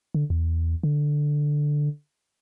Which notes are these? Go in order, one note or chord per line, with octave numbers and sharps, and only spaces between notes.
D3
E2
D3